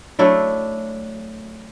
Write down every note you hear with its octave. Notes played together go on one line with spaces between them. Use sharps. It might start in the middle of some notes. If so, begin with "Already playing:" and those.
F#3 A3 D4 E4